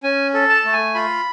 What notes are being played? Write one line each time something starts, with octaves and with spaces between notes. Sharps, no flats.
C#4 G#5
A4
A5
A3
G#5
F4 B5